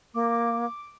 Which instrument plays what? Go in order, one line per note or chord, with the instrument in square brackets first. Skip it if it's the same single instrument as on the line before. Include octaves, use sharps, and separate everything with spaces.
[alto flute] A#3 [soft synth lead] D6